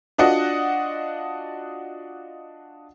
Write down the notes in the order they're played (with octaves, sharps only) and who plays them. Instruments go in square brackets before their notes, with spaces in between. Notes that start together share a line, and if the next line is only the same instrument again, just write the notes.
[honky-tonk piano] D4 F4 F#4 D5 D#5 F#5